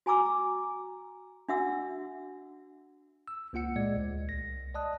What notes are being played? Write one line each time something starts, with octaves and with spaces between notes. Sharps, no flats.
F#4 G#5 A#5 D6 E6
D4 F#4 E5 F#5 E6
E6
C#2 A#3 F4 F#5 C#7
A#2 G#3 D5 D#5 G#6
D2
C2 A#6
D5 D#5 A5 D#6 F#6